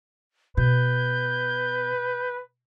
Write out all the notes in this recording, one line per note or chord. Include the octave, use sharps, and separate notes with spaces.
B2 B4 G6